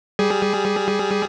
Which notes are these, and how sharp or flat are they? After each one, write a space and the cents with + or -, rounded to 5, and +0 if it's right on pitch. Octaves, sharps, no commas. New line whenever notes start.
G3 +0 G#4 +5